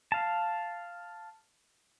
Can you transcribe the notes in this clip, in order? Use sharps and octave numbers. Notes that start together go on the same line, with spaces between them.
F5 A5